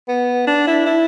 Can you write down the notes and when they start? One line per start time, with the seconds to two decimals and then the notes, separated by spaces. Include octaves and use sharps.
0.08 B3
0.47 D4
0.67 E4
0.86 E4